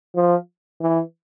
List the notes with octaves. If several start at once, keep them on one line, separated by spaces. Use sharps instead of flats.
F3
E3